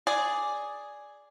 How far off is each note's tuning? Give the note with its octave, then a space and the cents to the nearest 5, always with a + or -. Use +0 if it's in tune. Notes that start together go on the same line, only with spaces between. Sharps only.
G#4 +0 D5 +0